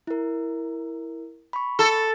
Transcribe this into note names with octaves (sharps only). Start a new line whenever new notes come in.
E4 A#4
B5 C#6
A4